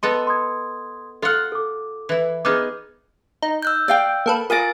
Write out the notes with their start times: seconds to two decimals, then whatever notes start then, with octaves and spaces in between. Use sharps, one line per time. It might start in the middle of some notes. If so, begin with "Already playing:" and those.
0.03 B3 A4 D#5 C6
0.27 C6 D#6 G#6
1.22 F4 A4 F#5 F6
1.52 A4 D6
2.09 E3 E4
2.45 B3 D#4 G#4 D6 F6
3.42 D#4
3.62 E6 F#6 G6
3.88 D5 F5 G5
4.26 A#3 A4 B4
4.50 F4 A#4 D5 G#5 D#6 A6 A#6